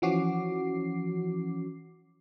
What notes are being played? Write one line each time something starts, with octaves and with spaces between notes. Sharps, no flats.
E3 F3 C#4 F#4 D6 C7